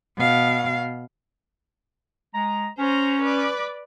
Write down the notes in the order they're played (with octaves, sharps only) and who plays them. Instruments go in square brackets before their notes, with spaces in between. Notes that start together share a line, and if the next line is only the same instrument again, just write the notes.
[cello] B2 F5
[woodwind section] G#3 A#5
[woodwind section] C#4 [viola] C5 A#5
[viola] B4 D5